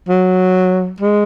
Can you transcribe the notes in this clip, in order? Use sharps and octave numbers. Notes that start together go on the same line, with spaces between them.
F#3
G#3